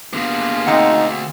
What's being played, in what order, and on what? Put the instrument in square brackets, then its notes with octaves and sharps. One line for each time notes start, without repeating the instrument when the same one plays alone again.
[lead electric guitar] D3 B3 [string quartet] A#3 F4 G#4
[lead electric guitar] D2 [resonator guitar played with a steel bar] B2 C4 F#5 [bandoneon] D#4